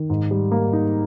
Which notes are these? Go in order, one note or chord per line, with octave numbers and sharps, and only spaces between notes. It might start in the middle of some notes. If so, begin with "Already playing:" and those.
Already playing: D#3
G#2
G3
A#3
D#4